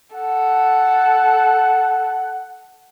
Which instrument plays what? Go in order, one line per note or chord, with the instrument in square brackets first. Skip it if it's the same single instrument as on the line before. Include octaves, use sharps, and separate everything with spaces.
[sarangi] A4 [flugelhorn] F#5